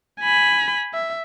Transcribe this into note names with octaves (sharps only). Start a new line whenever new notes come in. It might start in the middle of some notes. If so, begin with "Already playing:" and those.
G#5 B5
E5